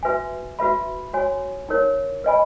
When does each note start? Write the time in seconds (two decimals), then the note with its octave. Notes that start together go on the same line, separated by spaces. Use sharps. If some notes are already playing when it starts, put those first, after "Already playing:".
0.03 F#4 B4 E5 G#5
0.59 F#4 B4 E5 B5
1.13 F#4 C#5 G#5
1.69 D#4 A#4 C#5
2.24 B4 D#5 G#5 B5